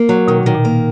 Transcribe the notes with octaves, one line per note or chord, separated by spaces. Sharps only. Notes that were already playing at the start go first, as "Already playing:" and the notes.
Already playing: A#3
F#3
B2 D#3
A#2
D#3
A#2
A#3